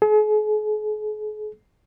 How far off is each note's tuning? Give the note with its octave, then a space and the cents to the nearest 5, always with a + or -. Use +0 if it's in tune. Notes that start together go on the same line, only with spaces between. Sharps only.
G#4 +45